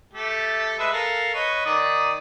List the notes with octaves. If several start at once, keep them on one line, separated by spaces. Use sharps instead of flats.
A3 G4 A4
G#3 B4 E5
A4 A#4 F5
B4 C#5 D#5
D#3 D5 D#6